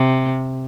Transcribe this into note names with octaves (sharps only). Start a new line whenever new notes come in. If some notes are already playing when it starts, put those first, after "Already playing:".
Already playing: C3